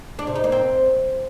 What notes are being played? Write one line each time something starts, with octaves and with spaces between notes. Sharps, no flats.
D4
C3
D#4
A#3
C4